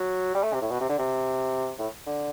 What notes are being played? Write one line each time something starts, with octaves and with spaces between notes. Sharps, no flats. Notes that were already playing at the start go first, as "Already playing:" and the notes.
Already playing: F#3
G3
A3
C3
A2
B2
C3
D3
C3
A2
D3